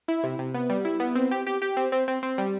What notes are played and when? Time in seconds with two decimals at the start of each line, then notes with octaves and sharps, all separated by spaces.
0.08 E4
0.23 C3
0.39 C3
0.54 B3
0.70 G3
0.85 E4
1.00 B3
1.15 C4
1.31 G4
1.47 G4
1.62 G4
1.77 C4
1.92 C4
2.08 C4
2.23 C4
2.38 G3